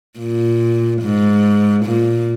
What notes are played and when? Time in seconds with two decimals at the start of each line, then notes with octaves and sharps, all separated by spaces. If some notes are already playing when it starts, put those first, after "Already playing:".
0.19 A#2
1.02 G#2
1.85 A#2